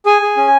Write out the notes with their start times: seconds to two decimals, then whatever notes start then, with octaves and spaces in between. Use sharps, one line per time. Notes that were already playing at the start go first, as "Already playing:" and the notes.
0.06 G#4 G#5
0.22 G#4
0.37 C#4